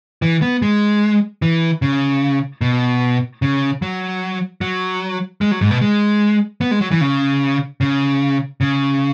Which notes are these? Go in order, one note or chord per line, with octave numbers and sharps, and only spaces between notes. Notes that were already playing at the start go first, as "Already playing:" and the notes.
E3
B3
G#3
E3
C#3
B2
C#3
F#3
F#3
G#3
F#3
G#2
B2
G#3
B3
G#3
F#3
E3
C#3
C#3
C#3